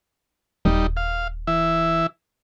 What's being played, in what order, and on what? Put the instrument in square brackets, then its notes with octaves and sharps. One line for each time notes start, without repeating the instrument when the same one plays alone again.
[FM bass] D#1 [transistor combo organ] G3 D#4
[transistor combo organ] F5
E3 E5